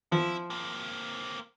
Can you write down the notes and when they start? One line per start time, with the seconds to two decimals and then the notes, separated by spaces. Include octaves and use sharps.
0.12 F3 E4
0.50 A#3 C4